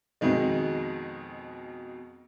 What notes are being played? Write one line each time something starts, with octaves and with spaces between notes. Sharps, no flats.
F2 B2 D#3 G#3